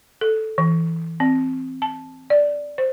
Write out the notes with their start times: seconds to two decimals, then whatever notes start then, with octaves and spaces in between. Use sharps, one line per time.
0.21 A4
0.58 E3
1.20 C4
1.82 A5
2.30 D5
2.78 C5